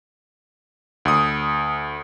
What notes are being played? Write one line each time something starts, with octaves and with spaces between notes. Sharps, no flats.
D2 D#6